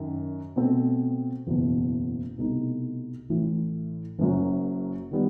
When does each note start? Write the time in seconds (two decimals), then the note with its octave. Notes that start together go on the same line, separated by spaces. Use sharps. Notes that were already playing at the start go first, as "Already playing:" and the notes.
Already playing: F#2 D#3 F#3
0.56 B2 A3 C4
1.47 F#1 E2 B2
2.38 C2 B2 A3 D#4
3.29 A1 A2 E3
4.19 F#1 F#2 F#3
5.11 D#3 G3 B3